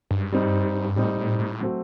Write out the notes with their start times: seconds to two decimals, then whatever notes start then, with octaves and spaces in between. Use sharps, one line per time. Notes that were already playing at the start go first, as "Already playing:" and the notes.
0.11 G2
0.32 G3 C4 D#4
0.96 A2 G3 C4 D#4
1.18 A2
1.39 A2
1.60 F#3 A3 C4 F#4